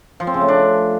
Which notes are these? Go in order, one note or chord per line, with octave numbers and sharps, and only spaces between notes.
F3
C4
C#3
A3
D4